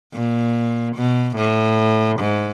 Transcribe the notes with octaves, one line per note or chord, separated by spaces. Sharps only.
A#2
B2
A2
G#2